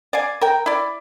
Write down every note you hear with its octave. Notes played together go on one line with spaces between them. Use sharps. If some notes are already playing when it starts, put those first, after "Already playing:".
D5 F5 G#5
A#4 G5
E4 D5